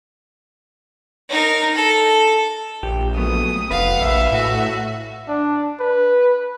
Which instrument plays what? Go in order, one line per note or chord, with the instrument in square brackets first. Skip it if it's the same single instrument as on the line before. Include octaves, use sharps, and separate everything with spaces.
[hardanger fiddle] D#4 A#4
A4
[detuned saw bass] A#1 [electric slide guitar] G4
[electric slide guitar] F#3 A3 B3 [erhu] D#6
[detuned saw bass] F1 [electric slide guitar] B4 [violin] F5 F#5
[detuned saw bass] A#1 [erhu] E5
[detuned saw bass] A2 [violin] F#4
[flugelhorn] D4
B4